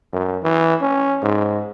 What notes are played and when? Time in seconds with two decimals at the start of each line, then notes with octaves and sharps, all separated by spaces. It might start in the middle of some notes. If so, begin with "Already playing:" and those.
0.13 F#2
0.43 E3
0.82 C#4
1.23 G#2